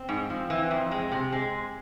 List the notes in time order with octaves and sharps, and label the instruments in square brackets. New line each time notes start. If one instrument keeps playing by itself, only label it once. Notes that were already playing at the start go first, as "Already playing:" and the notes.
Already playing: [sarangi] C4
[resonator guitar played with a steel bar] G#2
F3
[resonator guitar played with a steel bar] E3 [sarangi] C4
[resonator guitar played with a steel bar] F2
G#3
C3
G#3